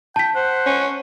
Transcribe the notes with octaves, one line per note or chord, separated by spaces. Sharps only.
G5 A5 B6
C5 F#5
C#4